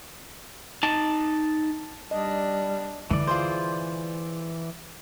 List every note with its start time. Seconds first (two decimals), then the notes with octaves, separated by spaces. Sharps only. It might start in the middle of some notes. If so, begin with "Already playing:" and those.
0.83 D#4 A5
2.11 G3 D4 D#5
3.11 D3 E3 E4 D5
3.27 F4 G#4 C5